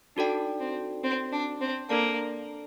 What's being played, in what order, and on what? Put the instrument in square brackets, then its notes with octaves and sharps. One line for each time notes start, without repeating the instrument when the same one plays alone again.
[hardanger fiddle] D4 [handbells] D#4 F#4 A4 D5 G5
[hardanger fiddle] C4
C4
D4
C4
[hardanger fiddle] A#3 [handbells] D4 A4 D5 A5